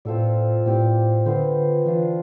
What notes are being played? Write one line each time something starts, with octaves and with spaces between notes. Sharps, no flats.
A2 C4 F4 A4 D5
A2 C4 G4 D5
D3 B3 F4 C5
E3 D4 F4 C5